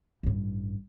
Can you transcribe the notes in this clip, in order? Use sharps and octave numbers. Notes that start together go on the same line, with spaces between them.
A1 G2